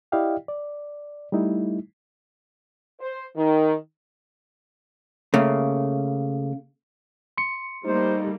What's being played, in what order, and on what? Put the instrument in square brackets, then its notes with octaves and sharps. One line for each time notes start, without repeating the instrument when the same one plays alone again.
[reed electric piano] E4 G4 D5 D#5 F5 G5
D5
G3 A3 D#4 E4
[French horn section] C5
D#3
[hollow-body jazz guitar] C#3 A3 A#3
[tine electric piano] C6 C#7
[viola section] G3 A3 A#3 [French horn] D#4 [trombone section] C5